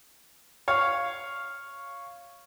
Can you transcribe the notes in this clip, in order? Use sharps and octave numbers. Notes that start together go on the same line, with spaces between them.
C#5 F5